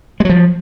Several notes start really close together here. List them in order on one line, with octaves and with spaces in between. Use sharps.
G#3 F#3 F3